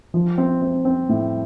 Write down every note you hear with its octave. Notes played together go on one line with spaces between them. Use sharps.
F3
C4
C4
C4
A2